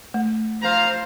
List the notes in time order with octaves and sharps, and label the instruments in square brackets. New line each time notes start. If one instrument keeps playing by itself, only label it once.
[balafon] A3
[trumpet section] G3 F4 A#5 [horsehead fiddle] C5 [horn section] F5